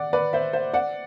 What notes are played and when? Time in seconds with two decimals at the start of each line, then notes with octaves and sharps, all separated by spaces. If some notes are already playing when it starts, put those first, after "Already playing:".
Already playing: D5 F#5
0.13 B4 D5
0.33 C5 E5
0.53 C5 E5
0.73 D5 F#5